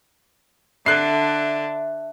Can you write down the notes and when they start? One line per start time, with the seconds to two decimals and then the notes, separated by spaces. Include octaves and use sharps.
0.86 D3 D4 E5 F#6 C7